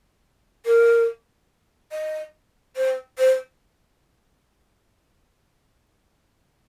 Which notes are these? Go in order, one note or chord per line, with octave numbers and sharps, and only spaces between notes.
A#4
D#5
C5
C5